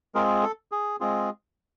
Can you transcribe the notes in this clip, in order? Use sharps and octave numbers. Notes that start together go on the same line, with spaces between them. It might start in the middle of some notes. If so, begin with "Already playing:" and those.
G#3 C4 F4 G#4 A#4
A4
G#4
G#3 C4 F4 G#4